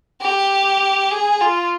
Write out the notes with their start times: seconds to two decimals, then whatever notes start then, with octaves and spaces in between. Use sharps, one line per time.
0.21 G4
1.12 G#4
1.42 F4